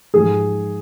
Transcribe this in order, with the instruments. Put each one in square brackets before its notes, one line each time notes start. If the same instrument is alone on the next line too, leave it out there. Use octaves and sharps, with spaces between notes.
[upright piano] G#2 F3 G#4